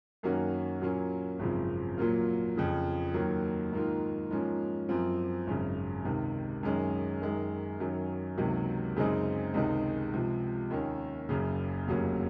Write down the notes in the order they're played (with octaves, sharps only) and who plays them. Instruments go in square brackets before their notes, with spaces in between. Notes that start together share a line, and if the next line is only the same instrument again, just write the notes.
[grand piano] F#2 D#3 A#3 C#4 F#4
A#2 F#3 A#3 C#4
G#1 F#2 C#3 F3 C4
A#2 F#3 A#3 F4
F2 C#3 F3
D#2 D#3 F#3 A#3
G#2 D#3 A#3 F4
G#2 F3 A#3 C#4
F#2 F3 C4 F4
G#1 F#2 C#3
C#2 C3 D#3
F#2 D#3 G#3 C#4
F#2 D#3 G#3
F#2 D#3 F#3 C#4
C#2 C3 D#3 F#3 A#3
F#2 C#3 G#3 C4 D#4
C#2 C3 D#3 G#3 D#4
C#2 C3 F3
D#2 D#3 A#3 C#4
F#1 F#2 C#3
F1 D#2 C#3 F#3 A#3